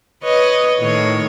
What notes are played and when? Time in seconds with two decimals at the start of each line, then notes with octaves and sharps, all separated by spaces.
0.23 B4 C#5 D#5
0.79 A2 D#3 C#5